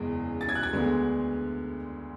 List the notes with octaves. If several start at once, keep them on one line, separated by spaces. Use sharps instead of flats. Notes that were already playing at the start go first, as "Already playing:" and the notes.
Already playing: F#1 E2 C#3 E3 G#3
A6
G#6
F#6
G#6
D2 D3 G#3 B3